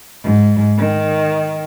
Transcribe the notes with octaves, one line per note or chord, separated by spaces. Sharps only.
G#2
D#3